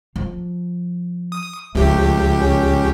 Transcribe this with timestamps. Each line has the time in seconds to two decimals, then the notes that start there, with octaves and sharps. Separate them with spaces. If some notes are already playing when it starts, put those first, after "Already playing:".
0.16 F3
1.32 D#6
1.75 C#2 F3 A3 G4
2.39 C#4